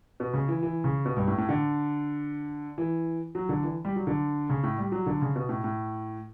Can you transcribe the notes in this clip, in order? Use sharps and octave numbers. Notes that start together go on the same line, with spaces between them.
B2
C#3
E3
E3
C#3
B2
G2
A2
A2
D3
E3
F#3
D3
E3
G3
F#3
D3
C#3
A2
G3
F#3
D3
C#3
B2
A2
A2